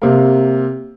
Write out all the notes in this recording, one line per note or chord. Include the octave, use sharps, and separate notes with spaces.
C3 A#3